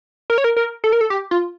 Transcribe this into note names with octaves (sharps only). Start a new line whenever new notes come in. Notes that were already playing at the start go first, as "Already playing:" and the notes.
A#4
C#5
A#4
A#4
A4
A#4
A4
G4
F4